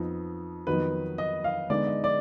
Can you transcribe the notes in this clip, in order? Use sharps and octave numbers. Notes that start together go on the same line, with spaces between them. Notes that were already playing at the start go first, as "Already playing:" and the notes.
Already playing: F2 F3 B3 D#4
F2 D#3 F#3 B3 D#4 B4
D#5
F5
D3 G#3 B3 D#4 D5
D#5
D5